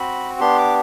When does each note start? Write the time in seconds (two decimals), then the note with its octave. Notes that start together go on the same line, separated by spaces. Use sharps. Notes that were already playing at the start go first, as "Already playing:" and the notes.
Already playing: C4 F#4 B5
0.40 B3 D4 G4 C6
0.58 D6